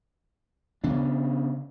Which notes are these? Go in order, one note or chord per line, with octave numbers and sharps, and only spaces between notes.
C#3 B3 D4